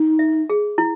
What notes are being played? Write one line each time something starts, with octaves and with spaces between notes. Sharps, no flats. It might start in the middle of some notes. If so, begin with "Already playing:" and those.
Already playing: D#4
E5
G#4
E4